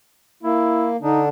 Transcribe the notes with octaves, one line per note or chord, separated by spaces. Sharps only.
A#3 E4
D3 D4 D#4